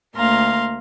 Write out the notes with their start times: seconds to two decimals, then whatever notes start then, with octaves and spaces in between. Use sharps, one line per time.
0.15 D2 A#3 F5 A#5 C6